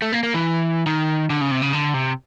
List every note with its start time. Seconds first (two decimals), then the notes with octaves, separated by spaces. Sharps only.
0.02 A3
0.12 A#3
0.23 A#3
0.34 E3
0.86 D#3
1.30 D3
1.41 C#3
1.51 C3
1.62 C#3
1.73 D3
1.94 C3